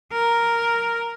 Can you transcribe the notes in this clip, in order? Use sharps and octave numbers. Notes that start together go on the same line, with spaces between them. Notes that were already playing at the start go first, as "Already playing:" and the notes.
A#4